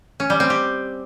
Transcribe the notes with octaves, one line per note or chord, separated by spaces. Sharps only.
C#4
G3
C4
G4